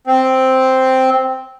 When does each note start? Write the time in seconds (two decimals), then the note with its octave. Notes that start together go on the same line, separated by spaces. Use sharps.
0.07 C4